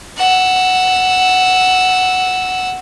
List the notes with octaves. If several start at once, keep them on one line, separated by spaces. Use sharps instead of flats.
F#5 E6